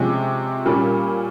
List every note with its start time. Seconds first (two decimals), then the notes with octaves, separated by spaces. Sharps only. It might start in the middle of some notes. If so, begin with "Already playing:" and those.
Already playing: C3 F3 G#3 C#4
0.65 A#2 G3 C#4